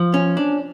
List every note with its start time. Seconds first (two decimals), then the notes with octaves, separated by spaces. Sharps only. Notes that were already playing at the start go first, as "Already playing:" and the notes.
Already playing: F3
0.14 C#4
0.37 D4